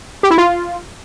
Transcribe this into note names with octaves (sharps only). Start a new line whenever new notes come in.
G4
E4
F4